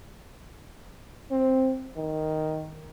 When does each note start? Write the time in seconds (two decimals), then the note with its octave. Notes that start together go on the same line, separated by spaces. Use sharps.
1.31 C4
1.96 D#3